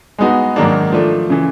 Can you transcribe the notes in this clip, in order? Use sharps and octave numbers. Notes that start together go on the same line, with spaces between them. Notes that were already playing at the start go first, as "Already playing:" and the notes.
G#3 B3 D#4 F#4
G#2 D#3 F#3 A#3 D4
F3 A3 D4
C#3 E3